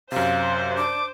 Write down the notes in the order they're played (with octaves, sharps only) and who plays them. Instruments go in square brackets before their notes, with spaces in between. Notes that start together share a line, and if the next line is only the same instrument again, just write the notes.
[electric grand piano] F#2 C3 [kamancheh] C5 [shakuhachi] F5
[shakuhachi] D4 [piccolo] D6